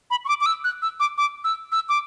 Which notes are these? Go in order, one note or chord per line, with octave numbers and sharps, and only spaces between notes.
B5
C#6
D6
D6
E6
F#6
E6
D6
D6
E6
E6
D6